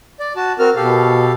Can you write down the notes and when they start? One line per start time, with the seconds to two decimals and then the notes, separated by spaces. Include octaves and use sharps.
0.20 D5
0.36 F#4 A5
0.59 C4 F#4 A#4 F6
0.76 B2 G4 A4 F5